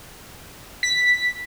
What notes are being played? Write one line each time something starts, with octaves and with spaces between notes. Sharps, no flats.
B6